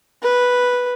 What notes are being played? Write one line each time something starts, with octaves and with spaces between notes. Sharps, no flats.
B4